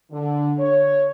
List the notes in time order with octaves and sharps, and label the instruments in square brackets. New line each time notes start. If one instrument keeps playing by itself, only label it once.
[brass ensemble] D3
C#5